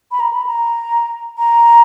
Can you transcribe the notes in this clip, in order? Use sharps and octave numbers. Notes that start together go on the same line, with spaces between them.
B5
A#5
B5
A#5
A#5